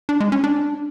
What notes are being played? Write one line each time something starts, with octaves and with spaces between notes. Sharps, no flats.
D4
G#3
C#4
D4